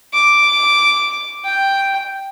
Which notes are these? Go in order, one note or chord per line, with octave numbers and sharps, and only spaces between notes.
D6
G5